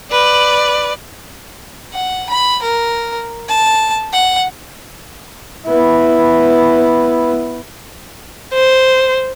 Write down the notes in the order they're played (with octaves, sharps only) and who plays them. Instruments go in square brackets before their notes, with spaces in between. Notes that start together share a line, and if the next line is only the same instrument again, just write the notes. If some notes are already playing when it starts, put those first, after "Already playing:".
[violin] B4 D5
[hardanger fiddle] F#5
B5
A#4
A5
F#5
[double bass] B3 E4
[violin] C5